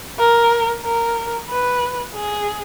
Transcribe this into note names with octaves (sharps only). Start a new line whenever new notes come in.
A#4
A#4
B4
G#4